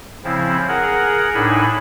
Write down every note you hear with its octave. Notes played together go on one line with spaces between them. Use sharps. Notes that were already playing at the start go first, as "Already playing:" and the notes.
C#3 F3 C4 E4
G#4 A#4 F#5
A2 D4 D#4 G#5 B5